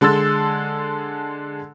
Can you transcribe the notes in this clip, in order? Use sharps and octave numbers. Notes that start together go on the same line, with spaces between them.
D3 G#3 A4 C6 E6 A6